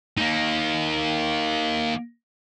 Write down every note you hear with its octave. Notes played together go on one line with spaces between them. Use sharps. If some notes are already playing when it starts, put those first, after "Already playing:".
A#3 D#4